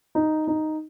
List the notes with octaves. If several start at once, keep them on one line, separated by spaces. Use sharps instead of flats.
D#4
D#4